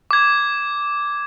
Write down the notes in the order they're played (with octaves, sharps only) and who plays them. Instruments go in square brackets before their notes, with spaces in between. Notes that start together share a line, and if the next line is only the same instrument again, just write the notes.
[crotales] D6 G#6